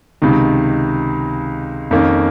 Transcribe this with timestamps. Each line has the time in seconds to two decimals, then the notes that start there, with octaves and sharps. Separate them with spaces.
0.22 C#2 C3 D#3
1.91 F2 D#3 A#3 C#4